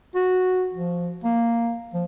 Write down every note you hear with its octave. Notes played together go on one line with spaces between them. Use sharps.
F#4
F3
A#3
F3